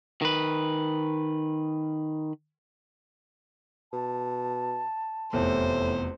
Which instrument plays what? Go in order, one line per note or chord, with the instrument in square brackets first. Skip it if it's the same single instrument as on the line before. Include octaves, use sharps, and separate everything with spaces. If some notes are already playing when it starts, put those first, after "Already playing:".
[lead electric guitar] D#3 B4
[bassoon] B2 [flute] A5
[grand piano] F1 E2 [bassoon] A2 [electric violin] C5